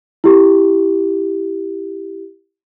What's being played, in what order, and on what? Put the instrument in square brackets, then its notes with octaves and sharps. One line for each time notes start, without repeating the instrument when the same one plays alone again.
[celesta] E4 G4